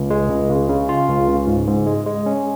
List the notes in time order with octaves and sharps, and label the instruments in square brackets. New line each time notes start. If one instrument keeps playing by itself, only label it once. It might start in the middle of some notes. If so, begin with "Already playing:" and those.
Already playing: [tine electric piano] C#2
G#3
C#2
C#3
C#3
F4
C#2
C#3
G#2
G#2
G#3
G#3
C#4